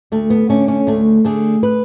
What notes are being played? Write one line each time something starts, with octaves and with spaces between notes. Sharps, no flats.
D2 A3
B3
D3 A3 C#4
C#4
D2 A3
D3 A3 G#4
B4